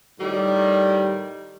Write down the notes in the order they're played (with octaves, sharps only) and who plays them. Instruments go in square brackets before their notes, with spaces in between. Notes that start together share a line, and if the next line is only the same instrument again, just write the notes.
[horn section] A2 D#3 G3